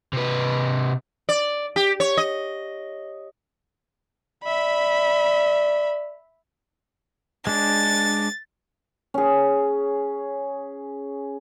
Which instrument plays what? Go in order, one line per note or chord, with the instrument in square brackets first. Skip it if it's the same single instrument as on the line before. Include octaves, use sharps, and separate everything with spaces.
[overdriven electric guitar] C3 B4
[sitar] D5
G4
C#5
D#5
[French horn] D5 [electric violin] E5 B5
[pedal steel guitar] G#3 D4 [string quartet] A6
[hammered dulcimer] C#4 G#4